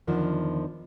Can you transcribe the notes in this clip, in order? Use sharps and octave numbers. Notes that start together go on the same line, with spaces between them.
E2 D3 D#3 F3